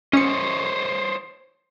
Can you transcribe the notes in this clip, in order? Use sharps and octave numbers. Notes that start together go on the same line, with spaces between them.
C#4 C5 C#5 D#5 C#7